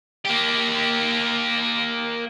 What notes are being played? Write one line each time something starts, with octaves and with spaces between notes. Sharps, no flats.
A#3 G4